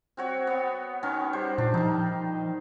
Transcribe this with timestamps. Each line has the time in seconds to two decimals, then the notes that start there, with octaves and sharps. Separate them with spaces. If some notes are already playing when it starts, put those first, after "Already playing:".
0.17 C4 F#4 C#5
0.47 B3
1.03 D#3 B3 C#4
1.33 G3 C5
1.58 A#2 D4
1.74 D#3 F3 D#4